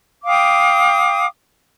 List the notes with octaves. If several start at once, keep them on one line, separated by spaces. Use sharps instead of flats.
F5 G5 D6 D#6